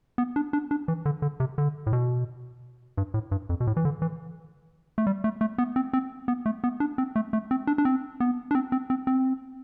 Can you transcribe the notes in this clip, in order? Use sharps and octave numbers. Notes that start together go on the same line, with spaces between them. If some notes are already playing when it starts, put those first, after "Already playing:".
B3
D4
D4
D4
E3
D3
D3
C3
D3
A2
B2
G2
A2
G2
F2
B2
A2
E3
D3
E3
A3
G3
A3
A3
B3
C4
C4
B3
A3
B3
D4
C4
A3
A3
C4
D4
D4
C4
B3
D4
C4
C4
C4
C4